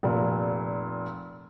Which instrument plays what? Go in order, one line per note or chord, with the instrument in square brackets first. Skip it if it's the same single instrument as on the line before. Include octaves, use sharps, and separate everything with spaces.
[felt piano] F1 A#2